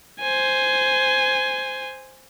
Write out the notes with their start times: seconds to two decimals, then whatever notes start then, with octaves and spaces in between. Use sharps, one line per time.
0.20 C5 G#5